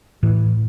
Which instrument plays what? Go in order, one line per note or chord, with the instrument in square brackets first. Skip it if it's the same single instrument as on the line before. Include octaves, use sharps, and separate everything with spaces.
[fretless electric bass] A2 E3